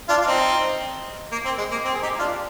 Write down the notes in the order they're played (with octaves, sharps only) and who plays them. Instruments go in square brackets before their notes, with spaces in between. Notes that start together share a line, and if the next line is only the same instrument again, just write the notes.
[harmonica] D4 F4
F4
C4 D#4
A#3
C4
G#3
A#3
C4
G#4
D#4 G4
D4 F4